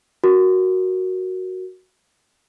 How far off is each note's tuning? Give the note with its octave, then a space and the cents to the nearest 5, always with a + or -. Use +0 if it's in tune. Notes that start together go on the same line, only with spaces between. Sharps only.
F#4 +0 A#4 +0